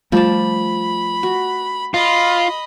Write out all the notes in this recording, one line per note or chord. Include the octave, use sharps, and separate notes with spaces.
F3 G3 A3 D5 A5 B5
F#4
F4 D#5 B5